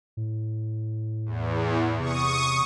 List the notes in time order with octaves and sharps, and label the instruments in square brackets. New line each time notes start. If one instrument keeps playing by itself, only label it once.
[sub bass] A2
[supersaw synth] E2
[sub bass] C3 [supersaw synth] C#6 D#6